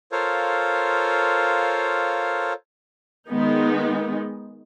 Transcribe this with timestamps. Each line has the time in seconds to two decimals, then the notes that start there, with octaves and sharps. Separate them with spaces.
0.12 F4 A4 A#4 C5 C#5 F5
3.29 D#3 G#3 B3 D#4